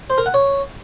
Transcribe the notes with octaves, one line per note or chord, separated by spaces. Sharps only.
C5
A#4
F#5
C#5